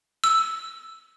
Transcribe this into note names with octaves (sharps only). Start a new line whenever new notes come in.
E6